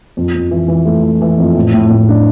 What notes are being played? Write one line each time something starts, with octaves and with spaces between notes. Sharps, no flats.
F2
F2
E3
E3
A3
E3
E3
F2
A2
A2
A2
D4